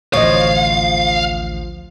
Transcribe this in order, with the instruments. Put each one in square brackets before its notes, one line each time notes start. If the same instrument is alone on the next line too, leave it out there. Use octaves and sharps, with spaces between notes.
[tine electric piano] A1 D2 [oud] F3 [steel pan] C#5 D#5 [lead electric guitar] F5